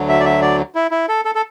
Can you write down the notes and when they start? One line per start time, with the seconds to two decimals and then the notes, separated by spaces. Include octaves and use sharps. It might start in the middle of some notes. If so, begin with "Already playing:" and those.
Already playing: D2 D3 F#3
0.09 E5
0.20 D5
0.25 E5
0.42 D5
0.75 E4
0.91 E4
1.08 A4
1.25 A4
1.35 A4